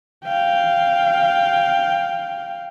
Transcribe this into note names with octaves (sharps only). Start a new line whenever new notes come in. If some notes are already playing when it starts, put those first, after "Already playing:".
F5 G5